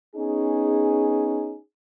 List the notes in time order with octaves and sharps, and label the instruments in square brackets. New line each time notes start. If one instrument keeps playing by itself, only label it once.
[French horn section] B3 C#4 D#4 G#4